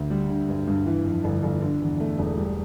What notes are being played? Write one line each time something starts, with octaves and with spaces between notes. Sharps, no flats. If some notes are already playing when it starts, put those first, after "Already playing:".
Already playing: D2
G3
D3
G2
G2
E3
F2
G1
G1
D3
E2
A3
E1
G3